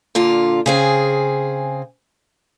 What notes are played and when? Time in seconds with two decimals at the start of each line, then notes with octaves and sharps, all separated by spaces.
0.15 A#2 D3 F4
0.66 C#3 C4 G#4